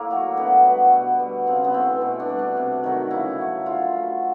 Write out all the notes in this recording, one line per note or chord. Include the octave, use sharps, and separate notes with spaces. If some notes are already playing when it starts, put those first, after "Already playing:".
Already playing: A2 A#3
F#3 A3
D3 B3
G3 B3
B2
G3
C#3 C4
B3
E3 A3 C4
B2
D4
G3
D4
C3
D#3 F#3 A3
C#3 E4
F#3 A3
D3 F4
F#3 A3